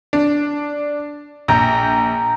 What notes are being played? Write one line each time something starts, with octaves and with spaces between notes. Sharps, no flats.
D4
A#1 G5 A#5